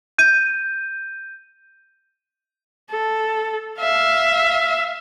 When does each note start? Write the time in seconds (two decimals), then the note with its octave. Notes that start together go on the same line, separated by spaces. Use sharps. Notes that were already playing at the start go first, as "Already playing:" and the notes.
0.18 G6 D#7
2.90 A4
3.80 E5 F5